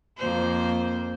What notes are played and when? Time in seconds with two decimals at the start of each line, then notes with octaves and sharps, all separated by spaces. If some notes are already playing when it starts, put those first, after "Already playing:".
0.18 F2 A#3 C5